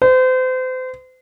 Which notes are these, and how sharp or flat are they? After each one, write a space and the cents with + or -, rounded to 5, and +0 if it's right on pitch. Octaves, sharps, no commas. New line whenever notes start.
C5 -35